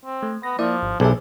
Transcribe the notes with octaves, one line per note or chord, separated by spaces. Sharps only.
C4
A3
B3 A#6
F3 A#3 E4 D5
G#1
B1 D4 G4 G#4 E5